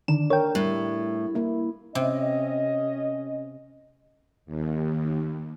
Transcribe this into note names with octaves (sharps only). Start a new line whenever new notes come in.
D3 D#3 D4 E7
A#4 C#5 G5
A2 G3
A#3 E4
C3 C#4 D#5
D#2